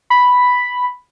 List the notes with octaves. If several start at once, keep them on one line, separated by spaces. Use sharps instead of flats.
B5